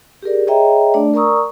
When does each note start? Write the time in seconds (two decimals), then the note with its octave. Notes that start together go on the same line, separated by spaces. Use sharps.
0.22 G4 G#4 A#4 D5
0.47 G#4 C#5 D#5 E5 G5 A#5
0.94 A3 D4 D5
1.14 A#4 D5 A#5 C#6 D#6 E6